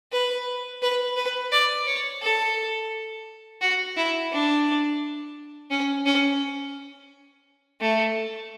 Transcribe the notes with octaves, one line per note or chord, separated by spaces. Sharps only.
B4
B4
B4
D5
C#5
A4
F#4
E4
D4
C#4
C#4
A3